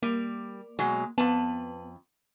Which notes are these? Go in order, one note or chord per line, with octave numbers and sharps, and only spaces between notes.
G3 A#3
B2 F#3 G#3
F2 B3 A5